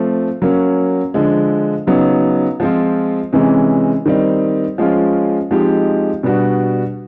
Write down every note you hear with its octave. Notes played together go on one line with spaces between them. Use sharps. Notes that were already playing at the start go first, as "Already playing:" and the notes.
Already playing: F3 A3 C4
F#3 A#3 C#4
D3 F3 G#3
C#3 F#3 B3 D#4
F3 G#3 C4 F4
C3 E3 G#3 C#4
D#3 G3 C4 D#4
F3 G#3 C#4 F4
F3 G#3 C4 D#4 G4
B2 G3 B3 D4 F#4